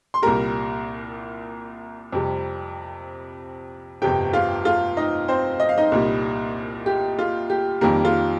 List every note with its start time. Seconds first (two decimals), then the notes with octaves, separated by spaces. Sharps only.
0.14 C6
0.22 C2 A#2 G3 A#4 A#5
2.13 F2 C3 G3
4.02 G1 F2 C3 G4 G5
4.33 F4 F5
4.65 F4 F5
4.97 D#4 D#5
5.28 C4 C5
5.60 D#5
5.69 F5
5.78 D#4 D#5
5.92 C2 A#2 G3
6.86 G4
7.19 F4
7.50 G4
7.81 F2 D#3 G3 A#3 A#4
8.05 F4